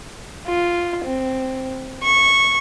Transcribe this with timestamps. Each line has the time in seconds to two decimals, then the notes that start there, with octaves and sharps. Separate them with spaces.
0.47 F4
1.05 C4
2.03 C#6